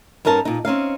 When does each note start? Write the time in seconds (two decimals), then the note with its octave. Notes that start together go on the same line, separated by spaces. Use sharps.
0.25 G2 C#4 D#4 A#4 A5
0.45 A#2 D#4
0.65 C4 C#4 D#4 F5